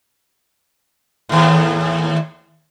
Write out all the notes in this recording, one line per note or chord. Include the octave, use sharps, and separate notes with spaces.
D#2 A2